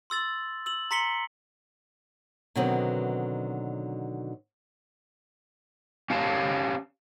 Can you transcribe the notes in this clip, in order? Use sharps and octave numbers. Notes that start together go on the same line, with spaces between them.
C6 E6 A6 F#7
E6 F#7
A#5 C6 B6 C#7 F#7 G7
B2 D3 D#3 F#3 B3 C4
C#4 G4 F5 G#5 A5